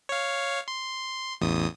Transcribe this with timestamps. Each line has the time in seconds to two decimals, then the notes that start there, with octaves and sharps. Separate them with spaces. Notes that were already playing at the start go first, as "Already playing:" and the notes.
0.09 C#5 F5
0.68 C6
1.41 A1 E2 D#6